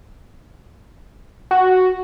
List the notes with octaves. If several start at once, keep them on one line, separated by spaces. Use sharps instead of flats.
F#4